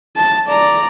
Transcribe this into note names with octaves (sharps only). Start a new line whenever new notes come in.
A5
D5 A#5